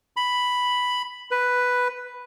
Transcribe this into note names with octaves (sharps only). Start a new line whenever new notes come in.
B5
B4